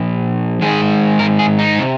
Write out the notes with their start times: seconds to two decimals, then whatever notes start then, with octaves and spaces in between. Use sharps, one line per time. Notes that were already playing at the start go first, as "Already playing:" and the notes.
Already playing: A#2 F3
0.61 G#2 D#3 G#3 G#4
1.19 A#4
1.39 G#4
1.59 D#4
1.79 C3